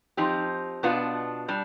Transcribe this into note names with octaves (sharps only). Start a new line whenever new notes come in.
F3 C4 D#4 G4
B2 B3 D4 F4
G3 D4